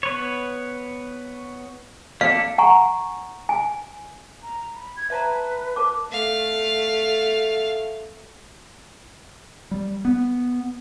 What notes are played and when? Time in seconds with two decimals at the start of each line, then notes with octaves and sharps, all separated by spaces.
0.03 B3 B4 C#5
2.21 A#3 D4 A4 F5
2.58 F#5 G#5 A#5 C#6
3.49 G#5
4.43 A#5
4.76 B5
4.97 G#6
5.10 B4 E5 A5 A#5
5.76 A#4 A5 D6
6.10 A3 F5
9.71 G3
10.05 B3